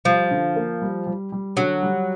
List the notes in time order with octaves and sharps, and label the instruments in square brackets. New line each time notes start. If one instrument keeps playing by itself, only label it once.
[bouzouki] F3 [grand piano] G3
[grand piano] D3
A#3
G3
G3
G3
[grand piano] D3 [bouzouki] F#3
[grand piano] G3